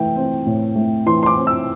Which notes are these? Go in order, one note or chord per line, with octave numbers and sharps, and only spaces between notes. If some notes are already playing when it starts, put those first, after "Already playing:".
Already playing: E3 A3 G5
C4
A2
A3
E3 C6
C6
D6
C4
E6